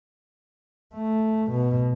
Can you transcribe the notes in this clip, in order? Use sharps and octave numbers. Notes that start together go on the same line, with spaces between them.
A3
B2